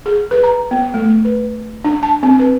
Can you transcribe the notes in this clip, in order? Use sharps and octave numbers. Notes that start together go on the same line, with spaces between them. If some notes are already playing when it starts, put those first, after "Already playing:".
G#4
B4
A#5
B3
A3
B4
D4
A5
C4
B4